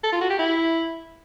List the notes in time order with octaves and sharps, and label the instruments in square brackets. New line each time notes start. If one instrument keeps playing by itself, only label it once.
[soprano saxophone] A4
F4
F#4
G4
E4